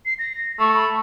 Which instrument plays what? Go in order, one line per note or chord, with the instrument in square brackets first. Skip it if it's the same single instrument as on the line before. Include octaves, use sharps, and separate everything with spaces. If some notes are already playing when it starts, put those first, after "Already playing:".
[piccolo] C7
A#6
[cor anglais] A3 [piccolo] C#6
[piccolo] B5